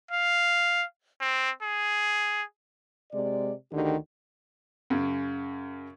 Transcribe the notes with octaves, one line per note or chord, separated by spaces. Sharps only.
F5
C4
G#4
C3 G#3 D5
D2 D3 D#3 G4
F#2 C#3